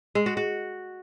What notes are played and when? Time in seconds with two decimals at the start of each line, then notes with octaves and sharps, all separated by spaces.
0.15 G#3
0.26 F#4
0.37 F#4